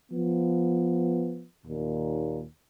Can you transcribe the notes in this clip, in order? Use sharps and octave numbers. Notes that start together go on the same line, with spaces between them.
F3 B3
D#2 A#2